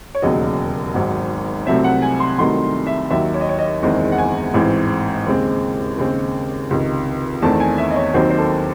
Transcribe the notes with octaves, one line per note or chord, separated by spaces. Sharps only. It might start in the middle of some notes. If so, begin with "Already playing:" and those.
C#5
E1 D#2 C#3 F#3 D#5
G#1 G#2 F#3
C2 C3 F#3 A3 C4 E5
F#5
G#5
C6
C2 C3 D#3 F#3 A3 C6
E5
D#2 D#3 F#3 E5
C#5
D#5
C#5
D#5
F#1 E2 D#3 G#3 C4
F#5
G#5
A1 G#2 E3 C4
D#2 C#3 G#3 C4
D#2 C#3 G#3 C4
C#2 C3 D#3
E2 D#3 A3 C4 A5
G#5
E5
D#5
C#5
D#2 D#3 F#3 C4 C5
C5
A4